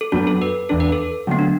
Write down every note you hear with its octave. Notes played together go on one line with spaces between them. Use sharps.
A4
F#2 F#3 B3 D4 F#4
A4
B4
E2 E3 D4 A4
B4
A4
D3 F#3 A3 B3
D4